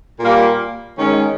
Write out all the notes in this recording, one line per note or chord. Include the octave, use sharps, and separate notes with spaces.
A#2 G3 A#3
D#3 G#3 C#4